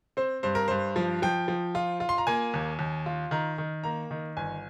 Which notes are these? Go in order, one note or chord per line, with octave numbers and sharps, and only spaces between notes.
C4 C5
G2 C5
A#4
G2 C5
F3
F3 G5
F3
F4
F4
C6
A#5
A#3 G#5
D#2
D#2
F4
D#3 A#5
D#3
A#3 A#5
D#3
G1 G#5